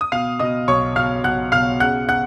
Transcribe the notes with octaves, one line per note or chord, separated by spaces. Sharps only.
D#6
B2 F5 F6
B2 D#5 D#6
B1 C#5 C#6
B2 F5 F6
B1 F#5 F#6
B2 F5 F6
C#3 F#5 F#6
F#5 F#6